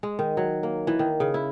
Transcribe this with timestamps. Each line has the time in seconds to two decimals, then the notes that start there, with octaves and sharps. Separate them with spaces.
0.03 G#3
0.19 D#3
0.37 F#3
0.63 A#3
0.87 E3
0.99 D#3
1.20 C#3
1.34 E4